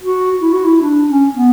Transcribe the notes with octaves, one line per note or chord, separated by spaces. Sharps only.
F#4
E4
F#4
E4
D4
C#4
B3